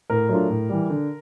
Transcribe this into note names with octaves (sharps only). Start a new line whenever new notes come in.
A2 A#4
F#3 A3 D4 F4
A2
E3 G3
D3